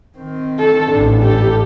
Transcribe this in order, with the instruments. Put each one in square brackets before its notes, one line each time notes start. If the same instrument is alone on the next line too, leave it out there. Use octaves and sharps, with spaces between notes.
[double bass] D#3 C4
[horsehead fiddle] A4
[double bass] A1 G#2 [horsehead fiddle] D4
[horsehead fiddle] G4 A4